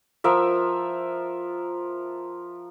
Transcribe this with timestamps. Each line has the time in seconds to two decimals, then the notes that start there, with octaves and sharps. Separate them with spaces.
0.24 F3 A#4 E5